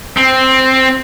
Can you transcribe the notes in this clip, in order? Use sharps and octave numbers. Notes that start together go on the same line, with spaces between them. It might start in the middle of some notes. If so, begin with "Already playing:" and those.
C4